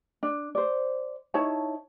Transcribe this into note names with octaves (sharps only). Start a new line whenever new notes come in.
D4
C5 D5
D#4 E4 C#5 A5